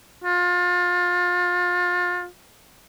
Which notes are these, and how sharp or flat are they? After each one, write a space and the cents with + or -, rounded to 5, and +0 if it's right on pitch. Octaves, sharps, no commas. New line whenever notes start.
F4 +30